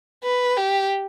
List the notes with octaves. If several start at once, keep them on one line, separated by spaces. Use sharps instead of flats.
B4
G4